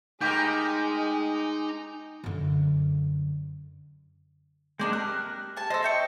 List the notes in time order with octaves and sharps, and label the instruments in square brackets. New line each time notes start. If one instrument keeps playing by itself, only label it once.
[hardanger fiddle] G#3 [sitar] A3 A#4 [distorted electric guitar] D#4 [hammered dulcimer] G4
[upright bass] F#2 D3
[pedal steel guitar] G#3 A#3 [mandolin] C4 D4 D#4
[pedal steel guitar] G4 F#6 [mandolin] A#4
[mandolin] G#5 A5
[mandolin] A4 C5 [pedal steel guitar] D#5
[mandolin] E5 G5 C#6